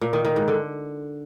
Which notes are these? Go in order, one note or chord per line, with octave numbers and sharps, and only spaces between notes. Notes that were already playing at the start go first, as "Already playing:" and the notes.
A#2
D#3
D#3
G#2
D3